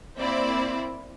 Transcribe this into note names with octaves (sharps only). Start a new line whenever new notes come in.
A#3 C4 E4 D5